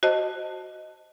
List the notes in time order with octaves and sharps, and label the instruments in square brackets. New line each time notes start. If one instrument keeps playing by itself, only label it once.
[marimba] F#4 C5 D#5 A5